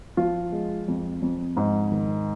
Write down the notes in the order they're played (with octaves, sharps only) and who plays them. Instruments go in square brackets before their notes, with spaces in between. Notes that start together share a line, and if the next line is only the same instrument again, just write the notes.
[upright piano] F3 F4
G#3
F2
F2
G#2
D#3